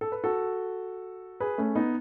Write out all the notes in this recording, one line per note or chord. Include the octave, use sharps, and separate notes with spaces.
A4
B4
F#4 A4
G#4 B4
A3 C#4
B3 D#4